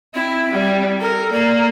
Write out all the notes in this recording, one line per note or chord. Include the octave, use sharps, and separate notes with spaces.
C4 E4
G3
A4 A#4
A#3 D5